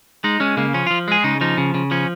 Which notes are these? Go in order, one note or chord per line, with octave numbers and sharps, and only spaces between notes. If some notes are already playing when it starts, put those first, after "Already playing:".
G#3 D#4
G#3 C#4
C#3 A#3
F3 C#4
F3 F4
G#3 G#4
C#3 D#4
F3 D#4
C#3
C#3
F3 C#4